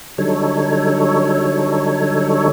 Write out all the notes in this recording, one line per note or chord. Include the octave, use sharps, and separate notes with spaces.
D3 F#3 G3 D#4 A4 C#5